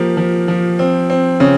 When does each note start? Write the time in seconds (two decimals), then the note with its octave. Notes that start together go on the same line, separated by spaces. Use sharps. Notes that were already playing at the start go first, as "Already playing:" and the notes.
Already playing: F3 A#3 G4
0.17 F3
0.48 F3
0.79 C4
1.10 C4
1.40 C#3